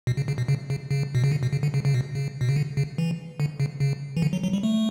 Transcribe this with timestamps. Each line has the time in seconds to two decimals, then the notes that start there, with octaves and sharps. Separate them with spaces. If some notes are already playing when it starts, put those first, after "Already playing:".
0.07 B2
0.17 C#3
0.28 C#3
0.38 B2
0.48 C#3
0.70 C#3
0.91 C#3
1.15 B2
1.24 C#3
1.32 D3
1.43 B2
1.53 C#3
1.63 D3
1.74 C#3
1.85 C#3
1.94 B2
2.15 C#3
2.41 B2
2.49 C#3
2.56 D3
2.77 C#3
2.98 E3
3.40 D3
3.60 C#3
3.80 C#3
4.17 E3
4.22 D3
4.33 F#3
4.44 F#3
4.53 G3
4.63 A3